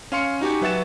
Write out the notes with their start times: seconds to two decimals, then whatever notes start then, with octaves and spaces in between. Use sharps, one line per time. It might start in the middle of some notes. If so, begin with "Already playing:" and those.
0.12 C#4 F5 C6 C#7
0.41 D#4 F#4 G4 G#5
0.61 F#3 B4 E5 F#5 A6 E7